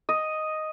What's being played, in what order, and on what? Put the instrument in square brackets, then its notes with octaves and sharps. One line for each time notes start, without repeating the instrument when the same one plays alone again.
[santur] D#5